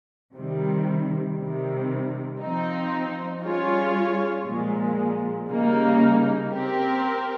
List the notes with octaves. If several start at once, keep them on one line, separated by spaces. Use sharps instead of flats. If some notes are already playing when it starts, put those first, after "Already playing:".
C3 D#3 G3
C3 D#3 G3
F3 C4 D#4
G3 C#4 F4 G#4 C#5
A#2 F3 G#3
C#3 G3 A#3 D#4
C4 G4 A#4